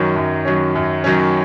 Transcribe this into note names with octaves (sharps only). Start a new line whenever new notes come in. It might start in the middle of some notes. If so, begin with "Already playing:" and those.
Already playing: F#2 D#3 F#3 C#4
F#2
D#3 F#3 C#4
F#2
D#3 F#3 C#4